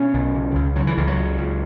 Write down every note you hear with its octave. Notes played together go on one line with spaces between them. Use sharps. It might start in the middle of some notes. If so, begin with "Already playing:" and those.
Already playing: B2 C#4
B1
C#3
C#2
C#3 F#3
E3
C#2 E3
F#3
C#3
C#2